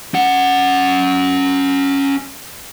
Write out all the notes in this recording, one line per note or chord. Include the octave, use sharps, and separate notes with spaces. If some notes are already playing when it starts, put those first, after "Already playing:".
C#4 F#5